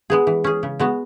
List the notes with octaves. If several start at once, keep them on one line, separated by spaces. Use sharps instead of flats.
G#3 B3 G#4
E3
C#4 G#4
C#3
G#3 B3 F#4